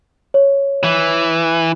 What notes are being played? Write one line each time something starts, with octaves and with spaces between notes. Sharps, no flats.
C#5
E3